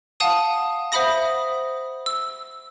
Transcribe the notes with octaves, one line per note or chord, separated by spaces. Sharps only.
F5 F#5 A5 D#6 D#7
C5 E5 F#5 B5 D#6 A#6
E6